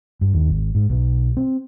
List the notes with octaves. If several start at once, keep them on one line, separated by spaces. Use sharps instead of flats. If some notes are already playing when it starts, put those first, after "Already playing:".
G2
D#2
G#1
G#2
B1
C4